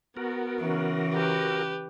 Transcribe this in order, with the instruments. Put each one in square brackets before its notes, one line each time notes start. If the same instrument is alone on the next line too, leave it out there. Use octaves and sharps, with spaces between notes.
[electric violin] B3 [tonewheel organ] F#4 A#4
[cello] C#3 E3
[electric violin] G4 B4